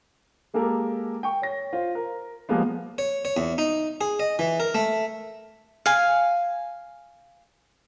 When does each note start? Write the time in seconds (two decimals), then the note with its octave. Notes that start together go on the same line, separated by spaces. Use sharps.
0.54 G#3 A#3 G4 A4 A#4
1.23 G5 C#6
1.42 C#5 A#6
1.73 F4 C5
1.95 A#4
2.49 F3 G3 G#3 A#3 B3
2.98 C#5
3.25 C#5
3.37 E2
3.58 D#4
4.01 G#4
4.20 D#5
4.39 E3
4.60 A#4
4.75 A3
5.86 F5 G#5